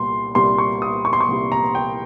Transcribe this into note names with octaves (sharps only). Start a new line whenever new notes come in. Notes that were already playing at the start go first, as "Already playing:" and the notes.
Already playing: C2 A#2 G3 C6
C2 A#2 G3 C6
C#6
D#6
C#6
C6
C#6
C2 A#2 G3
A#5
G5